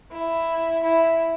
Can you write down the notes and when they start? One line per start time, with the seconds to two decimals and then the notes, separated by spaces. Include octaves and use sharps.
0.11 E4
0.83 E4